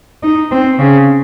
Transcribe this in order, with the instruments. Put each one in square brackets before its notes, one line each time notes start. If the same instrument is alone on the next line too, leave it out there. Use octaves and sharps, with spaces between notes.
[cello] D#4
C4
C#3